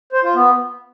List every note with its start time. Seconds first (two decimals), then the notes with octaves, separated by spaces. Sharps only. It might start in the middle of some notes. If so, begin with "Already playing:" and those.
0.13 C5
0.24 F4
0.35 B3